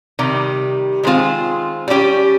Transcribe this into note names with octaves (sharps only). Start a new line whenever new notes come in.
C3 D#3 G3
D#3 G#3 C4 F4
G3 C#4 G4